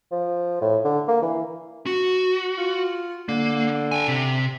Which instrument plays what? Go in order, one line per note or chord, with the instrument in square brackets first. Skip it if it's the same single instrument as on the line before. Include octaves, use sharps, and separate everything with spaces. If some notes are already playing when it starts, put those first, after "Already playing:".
[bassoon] F3
A2
D3
A#3
E3
[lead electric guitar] F#4
[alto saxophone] F4
[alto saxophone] D3 [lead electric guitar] A#3
[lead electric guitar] G5 G#5
C3